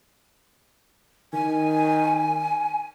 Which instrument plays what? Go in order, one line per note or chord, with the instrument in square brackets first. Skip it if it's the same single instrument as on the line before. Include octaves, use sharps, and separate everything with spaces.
[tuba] D#3 [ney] G#5